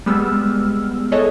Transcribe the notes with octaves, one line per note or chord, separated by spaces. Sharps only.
G3 G#3 B3 E6 F6
E4 G#4 A4 B4 C#5 D#5